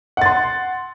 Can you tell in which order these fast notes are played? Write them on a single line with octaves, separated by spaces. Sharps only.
F#5 A6 C6